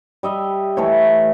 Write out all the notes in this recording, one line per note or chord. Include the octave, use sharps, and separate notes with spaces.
G3 D#5 E5
E3 A3 C#5